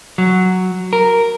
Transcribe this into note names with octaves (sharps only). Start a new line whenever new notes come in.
F#3
A#4